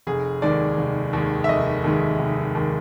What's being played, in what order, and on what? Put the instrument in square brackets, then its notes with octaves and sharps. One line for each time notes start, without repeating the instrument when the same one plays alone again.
[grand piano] F1 G#4
D#2 D#3 G#3 D5
F1
D#2 D#3 G#3
E5
F1 D#5
D#2 D#3 G#3
F1
D#2 D#3 G#3